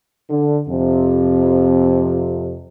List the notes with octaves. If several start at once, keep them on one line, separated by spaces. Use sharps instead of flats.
D3
F2 C3